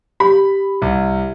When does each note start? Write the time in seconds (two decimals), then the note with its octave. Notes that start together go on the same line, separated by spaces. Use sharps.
0.20 G4 B5
0.82 C2